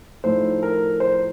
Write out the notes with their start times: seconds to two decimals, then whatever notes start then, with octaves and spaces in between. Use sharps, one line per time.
0.24 A2 F3 A3 D#4 C5
0.63 A#4
1.00 C5